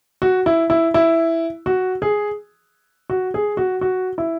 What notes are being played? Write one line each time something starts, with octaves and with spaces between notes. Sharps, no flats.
F#4
E4
E4
E4
F#4
G#4
F#4
G#4
F#4
F#4
E4